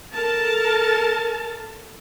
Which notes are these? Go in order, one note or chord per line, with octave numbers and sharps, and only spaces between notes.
A4 A#4 A5